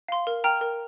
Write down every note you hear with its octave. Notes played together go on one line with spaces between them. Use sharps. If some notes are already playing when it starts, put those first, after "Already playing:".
F5 C6
A#4
G5 A#5 F6
A#4